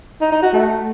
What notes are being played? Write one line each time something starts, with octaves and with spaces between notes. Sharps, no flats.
D#4
D#4
F#4
A3